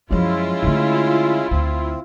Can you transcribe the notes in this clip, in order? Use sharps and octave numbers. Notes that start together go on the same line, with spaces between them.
F#2 F3 G#3 C#4 E4 F4
D3 A3
D2 C4